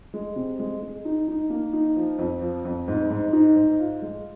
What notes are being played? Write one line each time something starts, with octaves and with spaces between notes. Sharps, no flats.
G#3
C3
G#3
G#3
D#4
D#4
A#3
D#4
F3
F2
F3
F2
G#2
G#2
D#4
G#2
F4
G#3